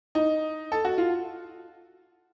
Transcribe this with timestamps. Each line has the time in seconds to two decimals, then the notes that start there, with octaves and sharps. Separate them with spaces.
0.15 D#4
0.72 A4
0.85 F#4
0.98 F4